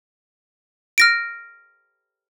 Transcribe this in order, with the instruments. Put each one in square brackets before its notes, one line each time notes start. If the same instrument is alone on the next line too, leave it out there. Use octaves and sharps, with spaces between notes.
[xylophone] F6 A#6 D7